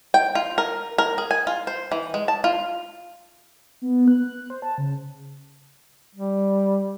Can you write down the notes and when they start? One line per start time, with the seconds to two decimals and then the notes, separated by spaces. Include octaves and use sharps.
0.14 G5
0.35 F4
0.58 A#4
0.98 A#4
1.18 G#4
1.31 G#5
1.47 F4
1.67 C5
1.92 E3
2.14 G#3
2.28 A5
2.44 F4
3.82 B3
4.08 F#6
4.50 C5
4.62 A5
4.78 C#3
6.15 G3